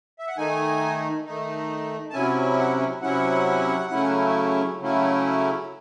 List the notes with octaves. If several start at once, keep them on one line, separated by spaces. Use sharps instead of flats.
E5
F#5
D#3 A3 D#4 G#5
D#3 A3 D#4
A5
C3 F#3 C#4 E4 G#5
F#5
C3 F#3 C#4 E4 F#5
C#3 F#3 A3 C#4 E4
C#3 F#3 A3 C#4 E4